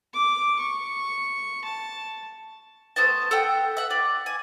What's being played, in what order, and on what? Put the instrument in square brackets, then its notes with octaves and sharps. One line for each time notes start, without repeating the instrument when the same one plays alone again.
[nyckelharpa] D6
C#6
A5
[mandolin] A3 B3 C5 A5
A4 E5 F#5 G5
E5 F#5
D5
G#5